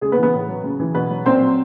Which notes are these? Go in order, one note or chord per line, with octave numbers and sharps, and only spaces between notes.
C#3 G#3 G#4
B3 B4
E3
B3 B4
A2
F#3
C#3
E3
B2 B3 B4
F#3
A#2 C4 C5
F#3